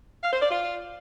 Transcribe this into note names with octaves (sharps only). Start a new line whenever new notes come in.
F5
C5
D5
F4